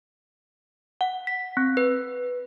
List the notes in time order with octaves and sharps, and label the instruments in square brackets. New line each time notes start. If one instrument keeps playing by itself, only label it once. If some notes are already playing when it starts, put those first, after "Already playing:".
[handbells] F#5
B6
C4
B4